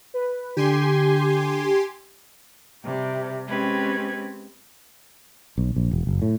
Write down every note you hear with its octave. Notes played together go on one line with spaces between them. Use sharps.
B4
D3 G4 G#5 C6
C3 G3
G#3 C4 C#4 G4 B4 G#6
B1
A#1
E1
F#1
A2